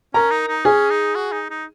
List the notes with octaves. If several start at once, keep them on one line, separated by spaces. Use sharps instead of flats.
C#4 A#4 A#5
D#4
D#4
C#4 G#4 G#5
D#4
F#4
D#4
D#4